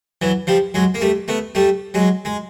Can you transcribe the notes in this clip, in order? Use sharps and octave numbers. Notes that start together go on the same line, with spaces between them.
E3 F#3
F3 G3
F#3 G#3
A#3
G3 A3
A3 B3
G3 A3
F#3 G#3
G#3